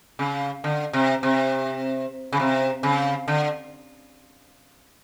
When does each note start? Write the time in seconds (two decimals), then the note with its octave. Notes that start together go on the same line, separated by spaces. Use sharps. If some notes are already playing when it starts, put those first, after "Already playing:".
0.19 C#3
0.64 D3
0.93 C3
1.23 C3
2.33 C#3
2.40 C3
2.83 C#3
3.28 D3